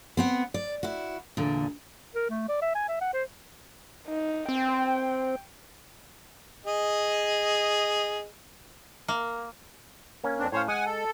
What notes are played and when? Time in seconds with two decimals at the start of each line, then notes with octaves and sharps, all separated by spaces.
0.17 B3 C4 F#5
0.54 D5
0.83 E4 F#4
1.37 E2 A#2 D3
2.15 A#4
2.30 A3
2.49 D5
2.62 E5
2.75 G#5
2.88 E5
3.01 F#5
3.13 C5
4.08 D#4
4.49 C4 G5
6.66 G#4 D#5
9.08 A#3
10.24 A#3 C#4
10.39 F2 C4 D4
10.52 A2 C#4 C5 C#5 F5
10.68 G#3 F#5 G#5
10.86 A4